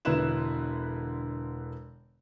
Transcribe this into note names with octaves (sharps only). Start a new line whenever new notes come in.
E1 D3 E4 B4 E7